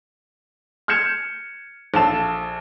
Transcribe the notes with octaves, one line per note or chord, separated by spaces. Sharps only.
F6 G6 G#6 C#7 E7
A#1 A4 F5 A5 E7